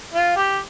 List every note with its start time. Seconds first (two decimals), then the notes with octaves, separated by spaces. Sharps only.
0.14 F4
0.36 G4